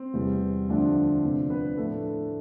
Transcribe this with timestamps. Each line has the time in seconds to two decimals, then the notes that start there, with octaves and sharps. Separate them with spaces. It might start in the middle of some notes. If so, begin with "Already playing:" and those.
Already playing: C4
0.13 E2 C3 G3 B3
0.68 D2 D3 F3 A3 D4
1.23 C3 F3 B3 D4
1.50 B3 B4
1.77 A2 F3 A3 D4 A4